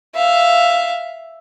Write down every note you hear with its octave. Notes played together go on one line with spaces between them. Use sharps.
E5 F5